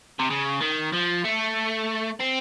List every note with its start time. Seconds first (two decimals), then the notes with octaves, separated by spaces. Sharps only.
0.20 C3
0.30 C#3
0.61 D#3
0.93 F3
1.25 A3
2.20 C4